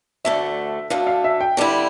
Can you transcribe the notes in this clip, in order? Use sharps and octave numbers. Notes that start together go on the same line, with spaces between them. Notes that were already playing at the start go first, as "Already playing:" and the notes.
D2 D3 A3 E5
D2 D3 A3 F5
F5
E5
G5
D3 G3 C4 E4